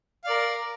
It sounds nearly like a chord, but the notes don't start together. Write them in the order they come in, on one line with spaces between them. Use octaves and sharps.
F5 D5 A#4